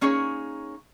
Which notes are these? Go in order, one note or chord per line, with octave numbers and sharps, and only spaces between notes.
A#3 C#4 D#4 G#4 C#5